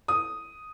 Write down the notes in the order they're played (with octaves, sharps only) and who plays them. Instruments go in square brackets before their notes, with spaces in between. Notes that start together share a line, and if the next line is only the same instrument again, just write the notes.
[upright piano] D#6